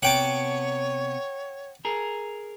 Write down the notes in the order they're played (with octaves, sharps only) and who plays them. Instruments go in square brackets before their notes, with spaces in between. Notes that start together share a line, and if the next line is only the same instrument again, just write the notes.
[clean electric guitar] C3 B3 F#4 [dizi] C#5 [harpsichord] F#5 G5 A5
[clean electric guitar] G#4 A#4